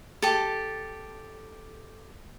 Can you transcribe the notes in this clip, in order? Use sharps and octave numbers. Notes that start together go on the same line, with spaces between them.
G4 A4